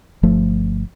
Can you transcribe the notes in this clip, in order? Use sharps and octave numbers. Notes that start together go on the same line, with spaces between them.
G1 F3 A3